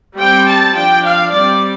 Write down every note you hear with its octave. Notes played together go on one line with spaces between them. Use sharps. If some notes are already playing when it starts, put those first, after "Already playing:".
G3 C4 G5
A5
F3 D4 G5
F5
G3 C4 D5